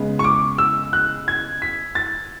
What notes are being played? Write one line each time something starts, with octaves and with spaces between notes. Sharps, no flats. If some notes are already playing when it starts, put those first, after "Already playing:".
Already playing: C#3 G#3 B3
C#6
D6
E6
F#6
G#6
B6
A6